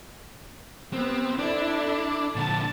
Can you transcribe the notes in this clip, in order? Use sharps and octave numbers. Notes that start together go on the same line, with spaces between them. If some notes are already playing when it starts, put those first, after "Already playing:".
B3 C4 G4
D4 E4 A4 D5
A#2 D3 A5